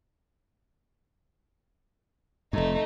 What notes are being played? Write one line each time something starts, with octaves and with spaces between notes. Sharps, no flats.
F1 F2 A3 D#4